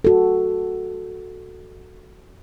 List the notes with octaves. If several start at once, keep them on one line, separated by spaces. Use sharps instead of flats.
F#4 A4